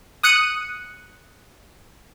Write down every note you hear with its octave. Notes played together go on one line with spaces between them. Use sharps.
D#6 F#6 C#7 D#7